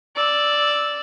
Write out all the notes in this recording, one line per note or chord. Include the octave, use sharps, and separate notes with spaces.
D5 E6